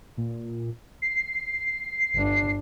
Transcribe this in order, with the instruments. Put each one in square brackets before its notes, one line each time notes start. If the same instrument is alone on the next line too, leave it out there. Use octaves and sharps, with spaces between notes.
[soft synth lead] A#2
C7
[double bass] G1 D4